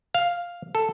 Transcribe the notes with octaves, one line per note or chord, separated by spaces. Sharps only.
F5
A4